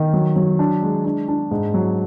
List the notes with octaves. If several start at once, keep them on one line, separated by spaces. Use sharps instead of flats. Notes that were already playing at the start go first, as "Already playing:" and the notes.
Already playing: D#3
F#3
F#3
D4
G#3
D4
D4
G#2
F#3